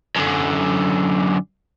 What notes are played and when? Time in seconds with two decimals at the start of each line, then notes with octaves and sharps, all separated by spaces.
0.16 F#2 D3